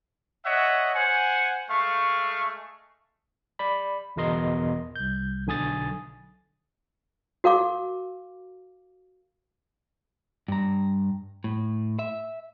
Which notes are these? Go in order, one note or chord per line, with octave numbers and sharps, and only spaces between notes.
C#5 D#5 E5 F#5
C5 F#5 G#5
G#3 A3 F5 C#6
D5 B5
G1 E2 B2 A#4 D#5 C6
C2 G6
B1 D3 G#5 D#6 A6
F#4 A#4 F5 D6
G2 A#5
A2
E5